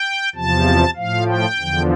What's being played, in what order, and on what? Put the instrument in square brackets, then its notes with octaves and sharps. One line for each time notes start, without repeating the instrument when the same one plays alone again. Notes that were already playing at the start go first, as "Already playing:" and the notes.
Already playing: [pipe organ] G5
E2 C3 F3 A5
A2 F3 F5
G5
E2 D3 F3